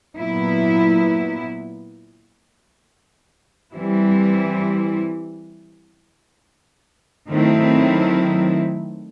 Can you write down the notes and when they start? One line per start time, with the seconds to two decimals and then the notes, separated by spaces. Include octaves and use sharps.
0.16 A#2 F#3 B3 E4
3.73 E3 G3 C4 E4
7.29 D#3 F#3 A3 C4 E4